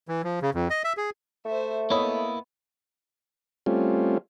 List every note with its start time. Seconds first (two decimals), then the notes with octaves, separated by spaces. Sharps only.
0.08 E3
0.24 F3
0.42 C#3
0.54 F2
0.70 D#5
0.84 E5
0.97 G#4
1.46 A3 C5 E5
1.90 A#3 B3 E4 C#5 D#5 D#6
3.66 G3 A3 C4 C#4 F4